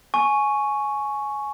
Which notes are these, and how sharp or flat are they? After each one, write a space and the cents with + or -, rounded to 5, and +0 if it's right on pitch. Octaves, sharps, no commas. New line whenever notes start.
G#5 +15 C#6 +0